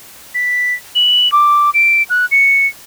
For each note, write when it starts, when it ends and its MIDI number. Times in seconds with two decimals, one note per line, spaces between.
0.34 0.74 95
0.95 1.30 102
1.32 1.70 86
1.74 2.03 98
2.10 2.26 90
2.31 2.67 97